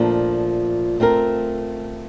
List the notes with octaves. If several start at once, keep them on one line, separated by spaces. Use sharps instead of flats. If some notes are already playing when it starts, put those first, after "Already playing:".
Already playing: A#2 F3 A3 D4
A3 C4 F4 A#4